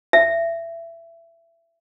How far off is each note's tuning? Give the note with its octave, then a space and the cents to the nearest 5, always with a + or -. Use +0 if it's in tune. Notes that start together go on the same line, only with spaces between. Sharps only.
E5 +25